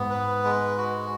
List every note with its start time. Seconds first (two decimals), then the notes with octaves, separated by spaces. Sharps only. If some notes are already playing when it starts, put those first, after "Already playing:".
Already playing: G#2 B3
0.10 B4
0.44 G#3
0.78 F#4